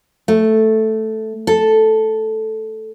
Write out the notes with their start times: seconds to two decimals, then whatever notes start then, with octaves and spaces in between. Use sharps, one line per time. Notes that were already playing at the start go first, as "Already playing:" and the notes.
0.28 A3
1.47 A4